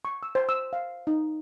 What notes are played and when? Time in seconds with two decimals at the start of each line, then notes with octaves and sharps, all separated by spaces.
0.05 C#6
0.23 E6
0.35 C5
0.49 E6
0.73 F5
1.07 D#4